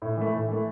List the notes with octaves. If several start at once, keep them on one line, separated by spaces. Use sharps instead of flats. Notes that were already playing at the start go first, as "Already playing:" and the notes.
A2
E3 A3
A2
E3 A3